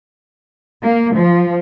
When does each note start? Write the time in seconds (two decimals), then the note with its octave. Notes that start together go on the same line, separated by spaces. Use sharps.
0.82 A#3
1.15 F3